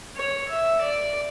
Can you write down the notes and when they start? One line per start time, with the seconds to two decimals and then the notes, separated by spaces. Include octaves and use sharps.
0.16 C#5
0.49 E5
0.81 D5